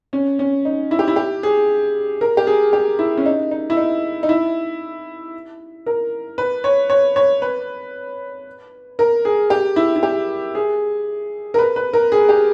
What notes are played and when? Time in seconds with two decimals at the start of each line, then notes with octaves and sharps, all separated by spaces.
0.13 C#4
0.39 C#4
0.65 D#4
0.91 E4
0.99 G4
1.08 E4
1.16 G4
1.43 G#4
2.21 A#4
2.37 G4
2.47 G#4
2.73 G4
2.99 E4
3.17 C#4
3.26 D#4
3.51 D#4
3.70 E4
3.77 D#4
4.23 D#4
4.29 E4
5.86 A#4
6.38 B4
6.64 C#5
6.90 C#5
7.16 C#5
7.42 B4
8.99 A#4
9.25 G#4
9.50 G4
9.76 E4
9.96 E4
10.03 G4
10.55 G#4
11.54 A#4
11.59 B4
11.76 B4
11.93 A#4
12.12 G#4
12.29 G4